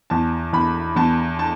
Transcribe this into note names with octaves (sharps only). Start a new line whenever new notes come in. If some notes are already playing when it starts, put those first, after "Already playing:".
E2 A5
E2 B5
E2 A5
A5